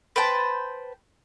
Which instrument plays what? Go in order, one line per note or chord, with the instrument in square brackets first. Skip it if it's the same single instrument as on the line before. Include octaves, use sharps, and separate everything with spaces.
[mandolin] B4 C5 G5 A5